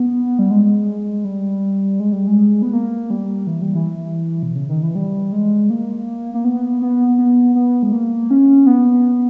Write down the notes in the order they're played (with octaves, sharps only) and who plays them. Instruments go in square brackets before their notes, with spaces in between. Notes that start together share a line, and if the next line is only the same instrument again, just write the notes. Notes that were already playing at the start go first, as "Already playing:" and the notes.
Already playing: [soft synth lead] B3
G3
G#3
G3
G#3
G3
G#3
B3
A#3
G3
E3
G3
E3
B2
C#3
D#3
E3
G3
G#3
A#3
A#3
B3
B3
B3
B3
G#3
A#3
C#4
B3